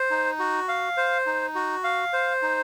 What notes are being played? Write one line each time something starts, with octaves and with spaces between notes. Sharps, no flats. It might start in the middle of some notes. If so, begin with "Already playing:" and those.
Already playing: C5
D#4
F#4
F5
C5
D#4
F#4
F5
C5
D#4